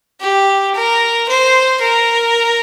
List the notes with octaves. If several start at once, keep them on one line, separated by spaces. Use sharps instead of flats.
G4
A#4
C5
A#4